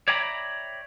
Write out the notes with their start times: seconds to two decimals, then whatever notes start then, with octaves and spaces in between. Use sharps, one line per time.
0.08 C#5 D5 E5 G5 A#5 B5